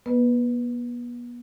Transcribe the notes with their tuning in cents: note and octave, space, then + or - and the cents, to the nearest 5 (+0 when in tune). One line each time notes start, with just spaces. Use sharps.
B3 -40 B4 +0 D#5 -30